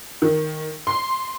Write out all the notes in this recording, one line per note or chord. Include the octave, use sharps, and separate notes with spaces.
D#3
C6